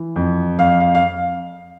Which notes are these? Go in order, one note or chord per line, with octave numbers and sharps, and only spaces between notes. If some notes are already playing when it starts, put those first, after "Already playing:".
Already playing: E3
F2
F2 F5
F5
F5